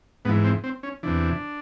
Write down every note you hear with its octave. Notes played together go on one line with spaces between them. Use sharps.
G#2 E3 B3
C4
C4
C#4
E2 C3 E3 D4